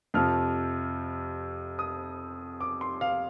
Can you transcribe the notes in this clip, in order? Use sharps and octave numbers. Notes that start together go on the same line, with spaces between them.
F2 C3 F3 F6
D#6
D6
C6
F5